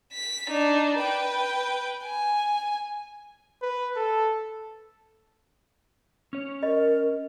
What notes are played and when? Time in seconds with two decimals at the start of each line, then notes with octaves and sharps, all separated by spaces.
0.13 B6
0.49 D4 D#4
0.98 B4 G5
2.04 G#5
3.62 B4
3.96 A4
6.33 C#4 C#5
6.63 A#4 D#5